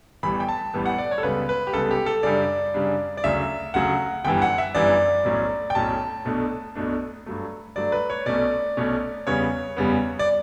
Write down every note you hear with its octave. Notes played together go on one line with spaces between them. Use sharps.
A1 A2 E3 G3 B3 B5
G5
A5
A1 A2 E3 G3 B3
F#5
D5
C#5
A4
C#2 C#3 G3 B3 B4
B4
G4
C#2 C#3 G3 B3 A4
G4
A4
F#2 C#3 G3 D4 D5
F#2 C#3 G3 D4
D5
D2 C#3 F#3 E5
D2 C#3 F#3 F#5
G1 F#2 E3 G3 G5
F#5
E5
G1 F#2 E3 G3 D5
B1 A2 F#3 C#4
G5
B1 A2 F#3 C#4 A5
B1 B2 A3 D4
B1 B2 A3 D4
G2 F#3 A3
G2 F#3 A3 D5
B4
C#5
B1 B2 A3 C#4 D5
B1 B2 A3 C#4
E2 C#3 G3 B3 C#5
E2 C#3 G3 B3
D5